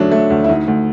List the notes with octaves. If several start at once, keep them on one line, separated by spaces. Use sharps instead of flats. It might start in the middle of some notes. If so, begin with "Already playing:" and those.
Already playing: D2 D3 F#3 A3 D4
A3
D2
E4
D2 D#4
D2